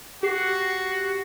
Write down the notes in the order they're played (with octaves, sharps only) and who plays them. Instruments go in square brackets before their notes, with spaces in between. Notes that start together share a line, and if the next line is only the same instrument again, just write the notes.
[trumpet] F#4 [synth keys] G4 C7